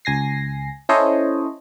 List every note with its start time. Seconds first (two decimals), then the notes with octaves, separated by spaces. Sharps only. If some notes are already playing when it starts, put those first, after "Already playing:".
0.05 C#2 G#5 A#6 C7
0.89 C#4 E4 A4 C5 C#5 D#5